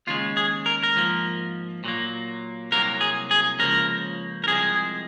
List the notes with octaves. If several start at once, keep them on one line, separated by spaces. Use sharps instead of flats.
D#2 C#3 G#3 F4
G#4
A#4
A#4
G#2 F3 A#3
A#2 F#3 A#3
C2 C3 F#3 A#3 A#4
G#4
G#4
C#2 C#3 F3 A#3 A#4
A#4
C2 C3 F3 G#3 G#4